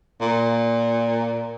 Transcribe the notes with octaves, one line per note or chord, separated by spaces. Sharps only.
A#2